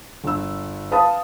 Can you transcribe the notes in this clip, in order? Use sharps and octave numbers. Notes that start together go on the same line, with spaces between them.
G1 E6
B4 F5 A5 D#6